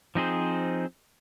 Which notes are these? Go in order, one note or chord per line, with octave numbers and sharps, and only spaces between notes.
F3 C4 D#4 G#4 C5